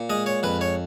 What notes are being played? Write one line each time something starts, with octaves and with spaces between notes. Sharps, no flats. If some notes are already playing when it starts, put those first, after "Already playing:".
Already playing: A#2
G#3 D#5
C#5
F2 B4
C#5